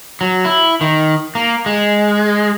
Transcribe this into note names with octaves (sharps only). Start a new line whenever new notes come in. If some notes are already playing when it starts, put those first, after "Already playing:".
F#3
E4
D#3
A#3
G#3